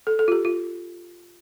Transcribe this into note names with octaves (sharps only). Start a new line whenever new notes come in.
A4
A4
F4
G4
F4